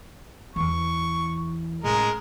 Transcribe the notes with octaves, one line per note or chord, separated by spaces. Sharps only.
E2 E3 C#6
A2 G#3 C#4 A#4